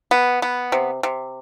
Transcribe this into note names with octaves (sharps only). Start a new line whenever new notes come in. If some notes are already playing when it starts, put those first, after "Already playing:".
B3
B3
C3
C3